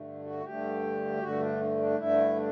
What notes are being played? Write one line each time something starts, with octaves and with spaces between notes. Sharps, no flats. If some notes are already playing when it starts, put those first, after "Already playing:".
Already playing: G2 D3 A3
F#4
G2 D3 A3 G4
G2 D3 A3 F#4
D4
D4
G2 D3 A3 E4
D4